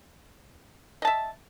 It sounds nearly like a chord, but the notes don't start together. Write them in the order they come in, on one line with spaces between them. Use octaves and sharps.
D#5 A5 E5